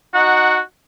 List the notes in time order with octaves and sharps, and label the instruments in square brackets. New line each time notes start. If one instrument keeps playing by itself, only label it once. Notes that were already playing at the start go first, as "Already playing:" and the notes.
[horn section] D#4 F#5 [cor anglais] F#4